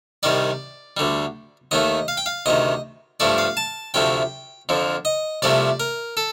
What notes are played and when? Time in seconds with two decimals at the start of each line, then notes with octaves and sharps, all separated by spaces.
0.23 C2 C3 D#3 G3 D5
0.97 D2 D3 G3
1.71 D#2 D#3 A3 D#5
2.08 F5
2.17 G5
2.26 F5
2.46 D2 C3 D#3 D#5
3.20 G2 F3 A3 D5
3.38 F5
3.57 A5
3.94 D2 C3 F3 A3 G5
4.69 F2 D3 F3
5.05 D#5
5.42 C2 C3 F3 A3 D5
5.80 A#4
6.17 A4